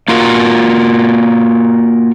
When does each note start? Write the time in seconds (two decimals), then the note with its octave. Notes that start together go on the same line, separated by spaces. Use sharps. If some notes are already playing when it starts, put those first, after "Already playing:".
0.08 A#3 F4 F#4 A#4